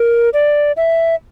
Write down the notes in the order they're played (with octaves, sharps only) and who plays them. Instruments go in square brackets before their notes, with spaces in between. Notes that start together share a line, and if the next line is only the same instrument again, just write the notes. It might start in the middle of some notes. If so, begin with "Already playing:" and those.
Already playing: [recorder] A#4
D5
E5